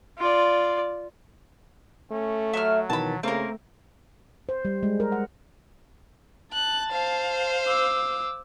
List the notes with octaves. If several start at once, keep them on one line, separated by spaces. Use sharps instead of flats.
F4 D5
A3 C#4
F#3 E5 F6
B2 D#3 E3 A5 B5
C#3 A3 A#3 C4 A#4
C5
G3
G#3
A#4
F#5
A5 F#6
C5 F5
D6 E6